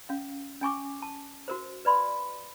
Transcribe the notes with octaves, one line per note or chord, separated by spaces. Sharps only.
C#4 F5
C#4 G#5 C#6 D6
A5
F#4 A#4 C5
B4 D5 B5 C6